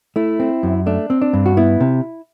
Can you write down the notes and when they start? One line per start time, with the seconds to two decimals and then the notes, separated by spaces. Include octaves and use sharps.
0.16 A3 E4
0.40 C4
0.63 F#2
0.86 A3 D4
1.10 C4
1.21 D4
1.33 G2
1.46 F#4
1.57 B3 E4
1.80 C3